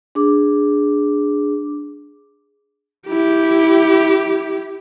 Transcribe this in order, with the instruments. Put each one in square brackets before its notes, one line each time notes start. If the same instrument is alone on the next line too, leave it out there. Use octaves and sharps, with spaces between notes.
[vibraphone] D4 G#4 D6
[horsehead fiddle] E4 G4